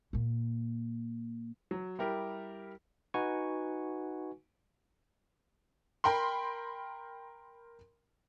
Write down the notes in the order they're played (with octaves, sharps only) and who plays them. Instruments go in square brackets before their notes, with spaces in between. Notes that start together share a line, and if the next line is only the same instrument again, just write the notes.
[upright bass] A#2 A#3
[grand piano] F#3
G3 E4 G4 A#4
[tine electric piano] D#4 F#4 B4 F#5 G#5 C#6
[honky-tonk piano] A#4 G5 B5 C6